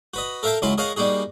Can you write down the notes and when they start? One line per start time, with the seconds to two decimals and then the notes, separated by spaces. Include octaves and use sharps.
0.14 F#4 B4 D#5
0.43 A4 A#4 E5 F5 G5 A5
0.62 C#2 F#3 C#4 E4 C6
0.78 G#4 A#4 C#5 D#5 F5 F#5
0.96 G3 A#3 D#4 F#4 G#4